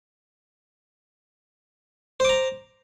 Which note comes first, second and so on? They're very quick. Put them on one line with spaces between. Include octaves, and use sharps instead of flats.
C5 D6 A#5